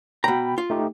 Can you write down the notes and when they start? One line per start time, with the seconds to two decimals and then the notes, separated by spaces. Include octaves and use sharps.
0.24 B2 G5 A#5 B5
0.58 F4
0.70 A3 D#4 G4